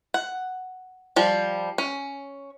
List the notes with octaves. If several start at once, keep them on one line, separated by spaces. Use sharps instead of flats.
F#5
F3 G3
C#4